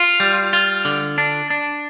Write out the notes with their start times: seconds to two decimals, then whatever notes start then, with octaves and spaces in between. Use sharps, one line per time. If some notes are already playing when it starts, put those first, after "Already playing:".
Already playing: F4
0.20 G3
0.53 F4
0.85 D3
1.18 D4
1.50 D4